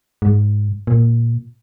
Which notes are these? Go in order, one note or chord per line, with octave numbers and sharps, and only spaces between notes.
G#2
A#2